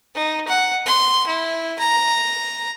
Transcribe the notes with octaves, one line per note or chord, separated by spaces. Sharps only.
D#4
F#5
C6
E4
A#5